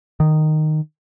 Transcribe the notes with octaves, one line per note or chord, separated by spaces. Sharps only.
D#3